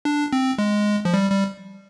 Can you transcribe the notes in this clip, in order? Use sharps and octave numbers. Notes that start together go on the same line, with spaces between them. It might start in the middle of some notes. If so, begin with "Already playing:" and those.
D4
C4
G#3
F3
G3
G3